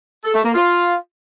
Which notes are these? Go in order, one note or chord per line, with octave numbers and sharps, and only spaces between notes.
A4
A3
A#3
F4